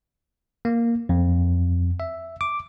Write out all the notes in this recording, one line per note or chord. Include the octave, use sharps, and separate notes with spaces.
A#3
F2
E5
D6